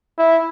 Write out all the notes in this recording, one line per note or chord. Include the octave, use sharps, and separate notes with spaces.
E4